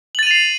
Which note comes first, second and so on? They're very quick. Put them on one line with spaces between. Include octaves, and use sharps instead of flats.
F#7 A6 D#7 F7 C7